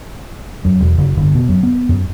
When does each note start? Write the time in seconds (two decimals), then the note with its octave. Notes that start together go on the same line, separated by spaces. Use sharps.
0.65 F#2
0.80 E1
0.98 F#1
1.17 G1
1.35 B2
1.49 F#2
1.63 B3
1.89 F#2